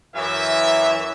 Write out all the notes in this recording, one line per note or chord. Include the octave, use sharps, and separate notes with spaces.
F#2 E3 E5